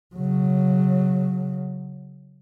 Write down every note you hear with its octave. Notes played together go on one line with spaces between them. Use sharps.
C#3 F#3